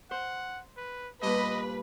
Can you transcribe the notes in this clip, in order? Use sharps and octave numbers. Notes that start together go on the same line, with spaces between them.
C5 F#5
B4
G2 A#2 B4 D#5